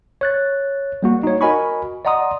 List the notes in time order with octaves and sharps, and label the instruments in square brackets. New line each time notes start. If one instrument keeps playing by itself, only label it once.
[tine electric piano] C#5 F#6 A6
G3 A#3 F#4
D#4 C#5
F#4 A#4 D#5 G#5 B5 C#6
D5 D#5 F#5 A#5 C6 D#6